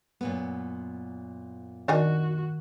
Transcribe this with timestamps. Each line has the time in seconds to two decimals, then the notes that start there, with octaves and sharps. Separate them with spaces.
0.21 F#2 A#2 B3
1.88 D#3 D4 D#4 F#4 A#4 G#5